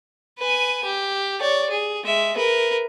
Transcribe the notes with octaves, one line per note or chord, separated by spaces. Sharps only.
B4 G#5
G4
C#5 D5
G#4
G#3 E5
A#4 B4